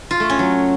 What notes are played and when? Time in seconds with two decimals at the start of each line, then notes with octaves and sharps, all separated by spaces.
0.11 F4
0.20 A3
0.30 C#4
0.39 F#3